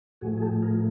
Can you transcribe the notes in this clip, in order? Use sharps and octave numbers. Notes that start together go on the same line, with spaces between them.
A2 F3 A3 F#4 G#4
G#4
G4 A4
G#4 A#4